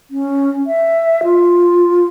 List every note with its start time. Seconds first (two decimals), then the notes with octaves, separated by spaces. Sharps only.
0.11 C#4
0.67 E5
1.24 F4